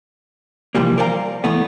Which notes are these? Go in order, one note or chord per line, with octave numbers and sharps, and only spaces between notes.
C3 E3 F3 G3 A#3
A#4 C5 D5 F5 F#5 A#5
C#2 E3 A3 B3